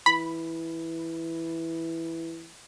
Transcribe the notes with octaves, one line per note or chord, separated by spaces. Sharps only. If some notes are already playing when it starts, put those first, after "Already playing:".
E3 B5